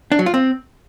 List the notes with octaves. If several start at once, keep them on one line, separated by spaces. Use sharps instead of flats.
D4
F#3
F4
C4